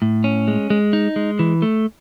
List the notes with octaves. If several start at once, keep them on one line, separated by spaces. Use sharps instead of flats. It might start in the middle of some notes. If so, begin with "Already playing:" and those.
A2
C#4
G#3
G#3
D#4
G#3
E3
A3